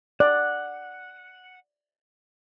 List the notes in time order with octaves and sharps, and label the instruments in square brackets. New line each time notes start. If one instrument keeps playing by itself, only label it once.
[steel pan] D5 [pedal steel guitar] F#5